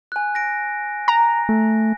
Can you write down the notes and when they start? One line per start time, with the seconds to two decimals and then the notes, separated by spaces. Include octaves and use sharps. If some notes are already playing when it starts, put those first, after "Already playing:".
0.12 G#5 F#6
0.35 A#6 D7
1.08 A#5 A#6
1.49 A3